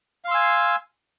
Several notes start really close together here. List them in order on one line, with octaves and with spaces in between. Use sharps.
F5 C6 E6 G#5